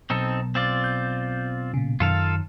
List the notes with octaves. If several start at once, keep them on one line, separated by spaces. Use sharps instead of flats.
B1 C4 D#4 A4
C4 F4 D5
G6
A#2 C#3
F#2 D#3 F4 A4 F5